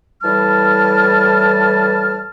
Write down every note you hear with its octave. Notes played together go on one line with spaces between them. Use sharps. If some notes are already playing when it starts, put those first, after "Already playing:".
A2 E3 G3 A5 F6